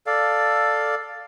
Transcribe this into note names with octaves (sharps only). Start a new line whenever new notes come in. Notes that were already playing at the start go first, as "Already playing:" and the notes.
A4 D5 F5